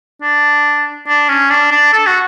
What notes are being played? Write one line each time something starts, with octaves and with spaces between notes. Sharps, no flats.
D4
D4
C#4
D4
D4
A4
F#4